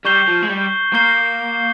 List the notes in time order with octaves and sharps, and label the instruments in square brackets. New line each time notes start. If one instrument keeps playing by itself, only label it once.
[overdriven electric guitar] G3 [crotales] C#6 G6 C7 G7
[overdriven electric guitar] F3
G#3
G3
[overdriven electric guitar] A#3 [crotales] C#6 G6 C7 G7